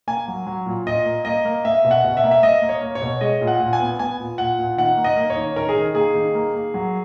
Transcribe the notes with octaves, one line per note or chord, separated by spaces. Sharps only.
A#3 G#5
F#3
F#3
A#2
A#2 D#5
A#3
A#3 D#5
A#3
A#3 E5
B2
F#5
B2
E5
A#3
E5
A#3 D#5
A#3
C#5
A#3
C#5
B2
G#3 D#5
A#2
F#5
A#2
G#5
B3
B3 G#5
A#2
A#2 F#5
A#2
D#3 F#5
A#3
D#5
A#3
C#5
D#3
D#3 A#4
G#4
D#3
A#3 G#4
D#3
A#3
A#3
F#3